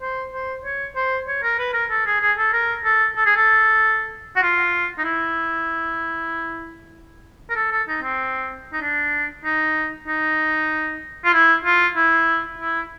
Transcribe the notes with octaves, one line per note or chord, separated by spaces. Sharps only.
C5
C5
C#5
C5
C#5
A#4
B4
A#4
A4
G#4
G#4
A4
A#4
A4
A4
G#4
A4
F#4
F4
D#4
E4
A#4
A4
A4
D#4
C4
D#4
D4
D#4
D#4
F4
E4
F4
E4
E4